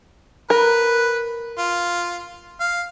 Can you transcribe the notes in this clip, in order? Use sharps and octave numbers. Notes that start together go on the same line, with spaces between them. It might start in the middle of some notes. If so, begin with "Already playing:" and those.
A#4 B4
F4
F5